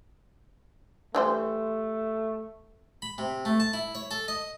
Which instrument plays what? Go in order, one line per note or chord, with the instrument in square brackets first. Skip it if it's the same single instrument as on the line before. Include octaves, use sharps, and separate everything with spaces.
[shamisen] E3 G3 C5 [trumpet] A3
[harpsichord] B5
C3
A3
A5
E4
C#5
A4
D#5